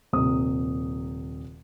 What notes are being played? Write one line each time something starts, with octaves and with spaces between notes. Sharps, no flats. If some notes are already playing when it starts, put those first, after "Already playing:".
D#1 C3 D#6